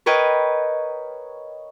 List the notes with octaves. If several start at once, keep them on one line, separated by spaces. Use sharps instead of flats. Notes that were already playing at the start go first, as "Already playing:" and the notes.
A#4 B4 C#5 D#5 G5